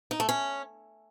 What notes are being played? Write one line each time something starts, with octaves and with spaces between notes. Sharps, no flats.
D#4
A3
C#4